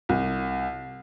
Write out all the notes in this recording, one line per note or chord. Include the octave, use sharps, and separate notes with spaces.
C2